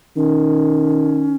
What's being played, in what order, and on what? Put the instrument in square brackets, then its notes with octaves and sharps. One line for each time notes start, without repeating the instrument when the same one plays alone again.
[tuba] D#3 [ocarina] C#4